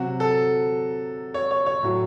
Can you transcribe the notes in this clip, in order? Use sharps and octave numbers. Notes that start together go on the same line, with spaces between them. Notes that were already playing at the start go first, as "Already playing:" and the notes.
Already playing: C3 F#3 F#4
A4
C#5
C#5
C#5
A2 F#3